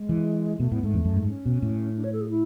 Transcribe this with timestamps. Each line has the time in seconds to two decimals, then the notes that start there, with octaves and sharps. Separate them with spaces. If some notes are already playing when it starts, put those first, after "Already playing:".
Already playing: G#3
0.09 E3
0.59 B2 A3
0.72 A2 B3
0.83 G#2 A3
0.94 E2
1.05 F#2
1.17 G#2
1.28 C#4
1.46 B2
1.62 A2
1.96 D4
2.04 C#5
2.12 A4
2.21 G#4
2.30 E4